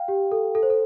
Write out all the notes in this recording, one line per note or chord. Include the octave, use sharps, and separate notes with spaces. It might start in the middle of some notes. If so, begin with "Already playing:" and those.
Already playing: F5 G5
G4
A4
A4
C5
A4